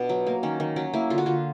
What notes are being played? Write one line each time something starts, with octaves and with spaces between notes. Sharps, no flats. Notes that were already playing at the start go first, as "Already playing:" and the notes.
Already playing: B2 B3 D4
F#3
A#3
D#3 C#4
D#3
F#3 C#4
A#3 E4
D3 F4
F#4
D3 F4